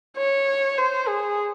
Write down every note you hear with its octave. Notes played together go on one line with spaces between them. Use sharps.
C#5
C5
G#4